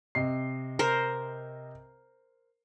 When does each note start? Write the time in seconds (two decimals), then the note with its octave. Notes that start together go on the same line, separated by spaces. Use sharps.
0.15 C3 D#5 C7
0.79 A#4 C5